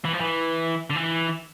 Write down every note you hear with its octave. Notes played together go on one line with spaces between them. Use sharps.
E3
F3
E3
D3
E3